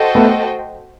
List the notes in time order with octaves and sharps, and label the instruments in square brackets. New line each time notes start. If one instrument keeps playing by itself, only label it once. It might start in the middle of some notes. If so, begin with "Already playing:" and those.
Already playing: [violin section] F#4 A4 C5 D#5 G5
[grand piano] A3 B3